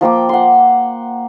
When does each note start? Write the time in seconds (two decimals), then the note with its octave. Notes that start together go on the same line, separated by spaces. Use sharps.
0.01 F3 A#3 G5 D6
0.29 F#5 C6